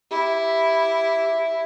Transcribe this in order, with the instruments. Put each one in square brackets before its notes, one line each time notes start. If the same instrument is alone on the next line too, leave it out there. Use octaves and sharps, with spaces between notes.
[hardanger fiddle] E4 [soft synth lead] G4